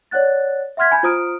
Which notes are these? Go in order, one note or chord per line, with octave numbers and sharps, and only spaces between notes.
C#5 D5 F#5 F#6 A6
E5 F#5 C6 F6 G#6 B6
G#5 B5 G6 G#6
F4 C5 A#5 D#6 F6 D7